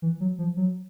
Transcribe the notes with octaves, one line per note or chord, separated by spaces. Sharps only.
E3
F#3
F3
F#3